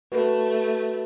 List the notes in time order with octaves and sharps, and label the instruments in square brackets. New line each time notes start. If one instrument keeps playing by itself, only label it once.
[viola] A3 [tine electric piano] F#4 [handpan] B4